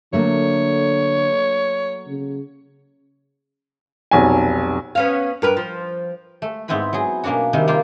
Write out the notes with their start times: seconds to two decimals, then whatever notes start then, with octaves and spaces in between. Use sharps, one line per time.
0.13 D3 F#3 A3 A#3 C#5
2.08 C#3
4.11 F1 B1 G#5
4.95 B3 C#4 F5
5.42 G2 A#4 B4
5.57 F3
6.42 A3
6.68 G#2 B3 C4 E4 B4 B5
6.93 F#3 G#4
7.24 B2 A#3 C#4 D4 F#4
7.53 C3 D#3 G3
7.68 A#3 F4 G4 F5